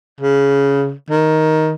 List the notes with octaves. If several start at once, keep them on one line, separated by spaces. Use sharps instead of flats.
C#3
D#3